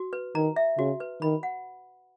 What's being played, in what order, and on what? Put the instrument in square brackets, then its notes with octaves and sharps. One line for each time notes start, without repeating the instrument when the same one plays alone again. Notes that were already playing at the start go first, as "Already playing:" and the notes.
Already playing: [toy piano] F#4
B4
[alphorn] D#3 [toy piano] A#5
[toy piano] E5
[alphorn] C#3 [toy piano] F#4
[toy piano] B4
[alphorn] D#3 [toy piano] B5
[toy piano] F#5